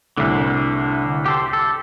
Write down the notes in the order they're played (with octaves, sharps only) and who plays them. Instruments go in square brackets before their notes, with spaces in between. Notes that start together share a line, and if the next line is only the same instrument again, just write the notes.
[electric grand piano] C2 A2 [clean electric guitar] D3
[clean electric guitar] G4 A4 C5
A4